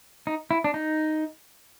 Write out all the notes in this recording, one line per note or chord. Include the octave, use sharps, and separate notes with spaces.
D#4
E4
D4
D#4